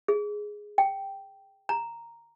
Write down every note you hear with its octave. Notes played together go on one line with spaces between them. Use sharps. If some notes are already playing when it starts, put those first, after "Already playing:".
G#4
G5
A#5